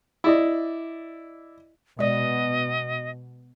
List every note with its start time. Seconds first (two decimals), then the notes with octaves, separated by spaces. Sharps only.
0.24 E4 D5 D#5
1.99 B2 G#3 D5 D#5